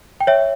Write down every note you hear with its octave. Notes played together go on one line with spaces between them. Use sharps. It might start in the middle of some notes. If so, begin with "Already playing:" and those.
G5
C#5 E5